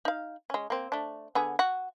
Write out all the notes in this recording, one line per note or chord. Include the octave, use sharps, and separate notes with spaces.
D#4 F5
G#3 C#4
A#3 C4
A3 D4
D3 B3 G#4
F#4